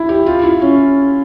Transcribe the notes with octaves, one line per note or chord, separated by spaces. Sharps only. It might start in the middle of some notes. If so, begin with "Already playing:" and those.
Already playing: E4
G4
F4
E4
C#4